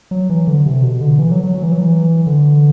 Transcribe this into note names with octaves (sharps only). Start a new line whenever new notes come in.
F#3
E3
D3
C3
B2
D3
E3
F#3
F#3
F#3
E3
F#3
E3
D3